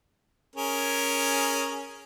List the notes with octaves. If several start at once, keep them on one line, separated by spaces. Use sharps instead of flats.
C#4 G#4 A#4